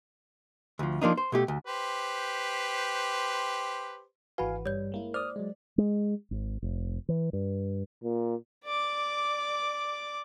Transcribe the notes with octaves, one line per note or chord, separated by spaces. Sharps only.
D2 F3
F3 A#3 D4 D#4
C5
B2 A3 G4
D2
G4 B4 C5
G#1 E3 F#4 B4 F5 G#5 B5
G2 G3 C#5 G6
G#3 A#3 E4
C5 D5 D#6 F6
F#3 G#3
G#3
G#1
F1
E3
G2
A#2
D5 D6